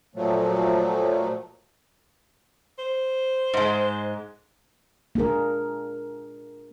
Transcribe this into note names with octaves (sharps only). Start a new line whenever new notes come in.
A#2 F3 F#3 A3
C5
G#2 G#3
A#3 D4 G#4 A#4